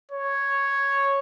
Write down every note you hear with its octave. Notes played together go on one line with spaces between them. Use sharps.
C#5